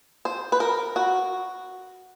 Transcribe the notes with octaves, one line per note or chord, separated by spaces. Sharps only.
C5
B4
A#4
F#4